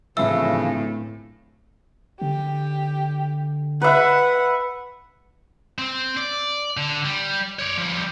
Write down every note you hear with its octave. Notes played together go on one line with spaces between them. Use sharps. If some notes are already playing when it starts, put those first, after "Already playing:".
D1 A2 C#3 E3 F3 E5 E6
D3 G4
B4 E5 F#5
C4
D5
D3
G3
C#5 D5
F3 G3